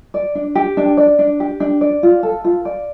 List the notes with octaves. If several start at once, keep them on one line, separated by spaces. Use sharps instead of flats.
D5
D4
G4
D4
D5
D4
G4
D4
D5
F4
A4
F4
D5